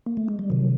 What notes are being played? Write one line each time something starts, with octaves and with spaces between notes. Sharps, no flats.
A#3
A3
G#3
G3
C3 D#3 F#3